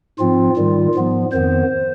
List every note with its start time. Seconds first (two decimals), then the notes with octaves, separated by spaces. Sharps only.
0.19 G#2 F3 C4 F4
0.57 G#2 D#3 G3
0.95 G#2 F3 B3
1.32 F2 D#3 B3 C5